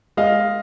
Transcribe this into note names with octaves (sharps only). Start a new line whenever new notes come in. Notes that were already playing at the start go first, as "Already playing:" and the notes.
G#3 D#5 F5